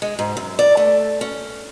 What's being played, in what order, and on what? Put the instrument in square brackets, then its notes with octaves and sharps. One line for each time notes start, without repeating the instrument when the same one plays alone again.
[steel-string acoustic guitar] G#3
G#2
F#2
D5
A3
C#4